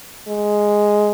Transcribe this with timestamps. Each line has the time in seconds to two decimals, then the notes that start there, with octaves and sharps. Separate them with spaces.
0.28 G#3